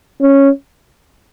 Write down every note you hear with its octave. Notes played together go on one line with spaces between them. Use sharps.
C#4